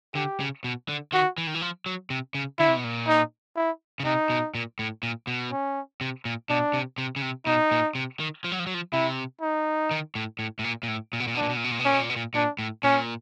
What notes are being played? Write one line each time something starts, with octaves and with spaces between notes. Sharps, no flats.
D3 G4
C#3
B2
D3
D#3 F#4
E3
D#3
E3
F3
F#3
C3
C#3
D3 E4
C3
B2
A#2
D#4
E4
C#3
C3 D#4
B2
A#2
A2
A#2
B2
C#4
C3
A#2
B2 D4
C3
C3
C#3
C3
B2 D#4
A#2
C3
D#3
F3
F#3
F3
F#3
F3
C3 E4
D#4
D#3
A2
A2
A2
A#2
A#2
A2
A#2
B2
A#2
B2
D4
A#2
B2
A#2
B2
A#2
B2
A#2 C#4
B2
A#2
B2
A#2
A#2 D4
A2
A#2 C#4